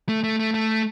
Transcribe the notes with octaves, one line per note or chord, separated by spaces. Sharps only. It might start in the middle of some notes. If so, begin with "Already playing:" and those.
A3
A3
A3
A3